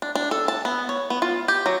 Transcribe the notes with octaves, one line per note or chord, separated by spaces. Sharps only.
D4
D4
A4
A5
B3
C#5
B3
F4
G4
F#3